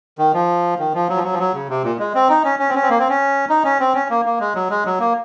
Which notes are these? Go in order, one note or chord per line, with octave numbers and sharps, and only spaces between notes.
D#3
F3
D#3
F3
F#3
F3
F#3
F3
F#3
C#3
C3
A#2
G#3
C4
D#4
C#4
C#4
C4
C#4
C4
A#3
C4
C#4
D#4
C#4
C4
C#4
A#3
A#3
G#3
F#3
G#3
F#3
A#3